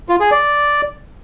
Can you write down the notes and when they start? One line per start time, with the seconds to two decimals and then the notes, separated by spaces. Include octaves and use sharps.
0.09 F4
0.20 G#4
0.32 D5